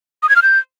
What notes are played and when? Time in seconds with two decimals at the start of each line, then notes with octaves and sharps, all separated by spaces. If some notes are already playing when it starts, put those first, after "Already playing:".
0.23 D#6
0.29 G#6
0.36 F6
0.42 G6